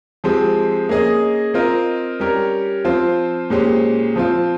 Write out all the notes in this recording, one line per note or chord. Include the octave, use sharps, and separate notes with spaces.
F3 G#3 C4 G4
A#3 C#4 G#4 D#5
C4 F4 A#4 D#5
G3 C#4 G4 A#4 C#5
F3 C4 F4 C5
A#2 G#3 C#4 G4 C5
F3 C4 F4